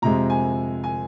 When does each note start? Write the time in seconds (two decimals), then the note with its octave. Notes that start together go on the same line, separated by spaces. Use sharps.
0.02 F2 C3 G#3 A#5
0.30 G#5
0.84 G#5